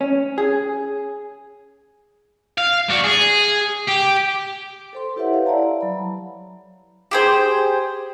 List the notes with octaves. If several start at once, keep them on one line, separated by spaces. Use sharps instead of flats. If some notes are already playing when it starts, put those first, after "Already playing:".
C#4
G#4
F5
D4 F#4
G#4
G4
A4 C5 C6
E4 G4 B4 C#5 E5 F#5
C#5 F5
E4 D5 F#5 A5 A#5
F#3 B5
G4 G#4 C5